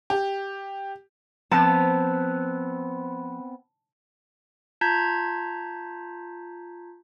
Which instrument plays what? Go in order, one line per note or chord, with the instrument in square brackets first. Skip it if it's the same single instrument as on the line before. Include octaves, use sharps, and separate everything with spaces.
[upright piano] G4
[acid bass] F3 [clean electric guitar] B3 C4 [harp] A5
[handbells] F4 A5 A#5 G6 G#6 B6